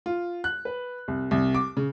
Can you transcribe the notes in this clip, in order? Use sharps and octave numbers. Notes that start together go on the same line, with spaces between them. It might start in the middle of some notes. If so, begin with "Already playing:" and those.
F4
F#6
B4
C2
C2
D6
C#3